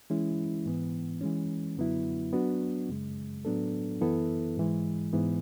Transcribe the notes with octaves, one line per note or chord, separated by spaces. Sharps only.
E3 G#3 C#4 E4
G#2 E3 B3
E3 G#3 C#4
F#2 D3 F#3 B3 E4
F#3 B3 D4 F#4
F#2 C#3 G#3
A2 F#3 B3 D4 A4
F#2 E3 B3 E4 A4
G#2 E3 G#3
G#2 E3 B3